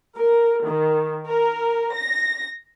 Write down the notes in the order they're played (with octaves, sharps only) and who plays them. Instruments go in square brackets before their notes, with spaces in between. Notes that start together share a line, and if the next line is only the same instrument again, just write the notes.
[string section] A#4
D#3
A#4
A#6